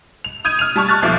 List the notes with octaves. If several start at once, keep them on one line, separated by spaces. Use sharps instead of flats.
F7
D#6 G6 G#6 D#7
F6 F7
G3 A5 C#6
C#6 F6 F#6 A6
B1 F3 A3 D6